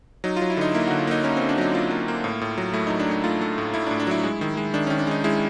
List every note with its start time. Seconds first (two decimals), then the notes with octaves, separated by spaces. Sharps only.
0.24 F#3 D#4
0.36 F4
0.42 F#3
0.50 E4
0.57 D3 D#4
0.75 A#3 E4
0.87 D3 F#4
0.99 F4
1.07 A#3 D#4
1.24 A#3 C#4
1.37 D3 C4
1.49 D4
1.58 F#3 D#4
1.74 A#3 F4
1.91 A#3
2.08 A#3
2.24 A2
2.41 A2
2.58 F#3
2.74 A3 E4
2.87 F#3 D#4
3.00 D4
3.08 A2 D#4
3.24 A3 F4
3.41 A3
3.58 A2
3.74 A2 E4
3.87 D4
3.91 A2
4.00 D4
4.07 F#3 E4
4.23 G#3
4.41 D#3
4.57 G#3
4.74 D#3 D4
4.87 D#3 C#4
4.99 D4
5.07 G#3 D#4
5.24 G#3 E4